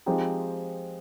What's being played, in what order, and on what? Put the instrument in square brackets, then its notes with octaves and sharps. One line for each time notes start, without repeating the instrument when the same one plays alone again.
[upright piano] F3 G#3 C4 D#4 G4